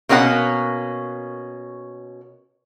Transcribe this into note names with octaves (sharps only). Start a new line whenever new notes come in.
B2 A#3 C#4 F4 F#5